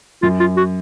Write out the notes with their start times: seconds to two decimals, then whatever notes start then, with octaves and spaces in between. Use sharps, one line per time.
0.22 F#2 F4
0.40 F4
0.57 F#4